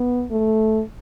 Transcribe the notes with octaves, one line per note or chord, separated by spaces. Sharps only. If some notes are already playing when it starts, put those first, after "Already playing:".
Already playing: B3
A3